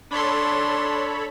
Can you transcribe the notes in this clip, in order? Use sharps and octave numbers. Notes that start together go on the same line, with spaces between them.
D4 A4 C#5 B5 C6